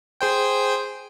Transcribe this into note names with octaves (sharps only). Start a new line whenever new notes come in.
G#4 C5 G5